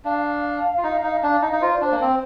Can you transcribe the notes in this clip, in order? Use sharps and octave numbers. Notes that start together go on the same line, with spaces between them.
D4 F5
F4
D#4
D#4
D4
D#4
D#4
F4 C5
D5
D4 C5
A#3
C4